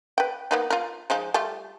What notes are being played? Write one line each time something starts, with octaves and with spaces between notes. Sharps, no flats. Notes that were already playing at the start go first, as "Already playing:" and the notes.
B4 G5
A#3 B3 D#4
F4 A#4
F3 G#3 D#4
G3 A3 F4